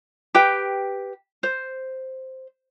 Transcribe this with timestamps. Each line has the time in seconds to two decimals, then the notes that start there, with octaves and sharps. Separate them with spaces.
0.35 G4 B4 G5
1.43 C5